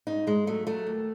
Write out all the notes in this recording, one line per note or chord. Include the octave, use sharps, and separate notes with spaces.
G#2 D#4
G#2 G#3
F#3 A3
F#3 A3
D#2